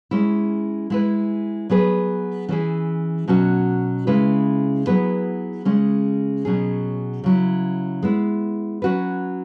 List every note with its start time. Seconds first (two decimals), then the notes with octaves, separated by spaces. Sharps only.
0.11 G#3 C#4 E4
0.90 G#3 E4 B4
1.70 F#3 B3 G#4 B4
2.49 E3 C#4 E4 G#4
3.28 B2 F#3 C#4 F#4
4.07 C#3 G#3 C#4 E4 B4
4.87 F#3 B3 E4 G#4 B4
5.65 C#3 G#3 C#4
6.45 B2 F#3 C#4 G#4
7.24 C#3 F#3 E4
8.03 G#3 B3 E4
8.82 F#3 C#4 F#4 B4